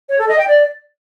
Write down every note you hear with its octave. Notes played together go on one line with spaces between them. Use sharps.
C#5
A4
D#5
G5
D5